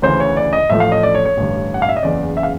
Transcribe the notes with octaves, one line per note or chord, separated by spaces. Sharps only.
D2 C#3 E3 C5
C#5
D5
D#5
A1 A2 F3 A3 E5
F5
D#5
D5
C#5
C#5
A1 G2 D3
F#5
F5
E5
D#5
F#1 E2 C#3 D5
E5
F5